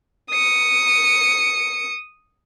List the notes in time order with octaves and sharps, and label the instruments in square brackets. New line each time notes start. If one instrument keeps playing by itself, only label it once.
[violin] D#6 C#7